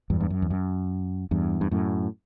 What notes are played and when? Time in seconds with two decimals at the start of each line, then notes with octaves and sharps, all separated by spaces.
0.10 E2 G2
0.20 G2
0.30 F#2
0.42 E2
0.50 F#2
1.31 E2 G2
1.61 G2
1.71 F#2 A2